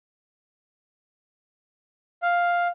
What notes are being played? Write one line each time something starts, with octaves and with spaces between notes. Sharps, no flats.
F5